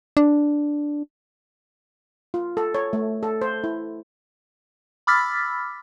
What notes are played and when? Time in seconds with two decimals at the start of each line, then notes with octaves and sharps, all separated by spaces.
0.17 D4
2.34 F4
2.57 A4
2.75 C#5
2.93 A3
3.23 A4
3.42 C5
3.64 E4
5.07 B5 D6 E6 F6 A6 B6